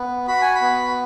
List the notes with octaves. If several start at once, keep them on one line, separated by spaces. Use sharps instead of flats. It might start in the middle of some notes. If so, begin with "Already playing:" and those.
Already playing: B3
F#4 B5
G#5
B5
B3